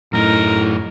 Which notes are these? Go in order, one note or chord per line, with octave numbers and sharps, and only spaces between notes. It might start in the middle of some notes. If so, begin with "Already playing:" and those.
F#2 A2 D#4 A#4